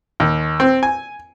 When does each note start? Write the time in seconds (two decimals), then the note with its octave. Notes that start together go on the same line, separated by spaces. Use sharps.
0.20 D#2
0.60 C4
0.83 G#5